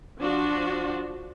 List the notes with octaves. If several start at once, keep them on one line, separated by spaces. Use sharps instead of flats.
F3 D4 F#4